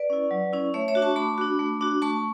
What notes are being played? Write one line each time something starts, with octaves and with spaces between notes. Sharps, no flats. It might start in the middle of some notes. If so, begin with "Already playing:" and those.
Already playing: B4 D5
C#4 E4
F#3
C#4 E4
A3 C#5 E5
C#5 E5
D4 F#4
A5 C#6
A3 B5 D6
D4 F#4
A3
D4 F#4
A3 A5 C#6